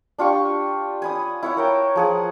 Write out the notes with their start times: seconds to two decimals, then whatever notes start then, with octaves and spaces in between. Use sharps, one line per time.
0.18 D4 F4 G4 C#6
1.02 G#5 B5 D#6
1.43 E4 C#5 F#5
1.57 A#4 G5 A5
1.96 F3 G#4 F#5